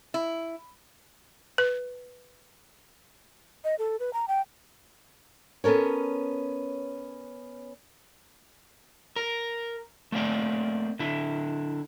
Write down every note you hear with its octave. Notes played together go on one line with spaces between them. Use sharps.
E4
B4
D#5
A4
B4
A#5
G5
B3 C#4 A4 A#4 C#5
A#4
A3 A#3 C4 D5
D3 E4